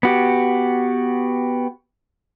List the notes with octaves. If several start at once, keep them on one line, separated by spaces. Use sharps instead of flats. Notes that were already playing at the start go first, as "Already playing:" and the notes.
B3 F#4 G4